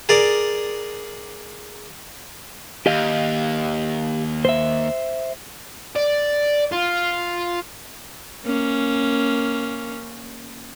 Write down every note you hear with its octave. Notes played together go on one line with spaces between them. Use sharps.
G#4 A#4 D5
D#2 G4 D#5 F5
C5 E5
D5
F4
A#3 C#4